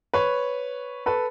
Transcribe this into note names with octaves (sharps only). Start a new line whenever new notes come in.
B4 C#5
A4 B4